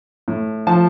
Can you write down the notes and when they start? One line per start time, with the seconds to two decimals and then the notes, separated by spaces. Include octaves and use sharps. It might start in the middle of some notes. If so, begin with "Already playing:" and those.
0.28 A2
0.67 F3 A5